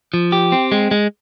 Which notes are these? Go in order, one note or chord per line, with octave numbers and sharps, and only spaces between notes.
F3
G4
C4
G#3
G#3